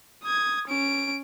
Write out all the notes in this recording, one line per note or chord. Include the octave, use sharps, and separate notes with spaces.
D#6 G#6
C#4 D7